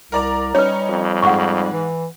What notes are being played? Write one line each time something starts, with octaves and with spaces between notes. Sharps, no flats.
C2 A#4 D5 A#5
G3 C#4 D#4 B4 C#5
F2
G#2 G#3 F#5 C#6
E3